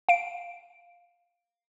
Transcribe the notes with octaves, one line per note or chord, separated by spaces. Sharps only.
F5 D7